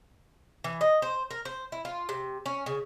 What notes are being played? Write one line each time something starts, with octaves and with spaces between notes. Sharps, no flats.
E3
D#5
C5
A#4
C5
E4
F4
C3
C#4
C#3